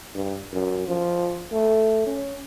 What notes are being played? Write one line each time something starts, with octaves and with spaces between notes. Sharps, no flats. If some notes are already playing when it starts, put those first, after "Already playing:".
G2
F#2
F3
A3
C#4